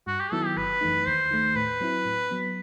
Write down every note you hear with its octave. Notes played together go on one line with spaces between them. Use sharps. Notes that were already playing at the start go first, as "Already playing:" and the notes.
G2 F#4
G4
D#3 F#3 B3 E4 A4
G4
G1 B4
F#2 E3 A3 D#4
D#2 C5
D#3 A3
A2 B4
F#3 C4 E4
A2
F#3 B3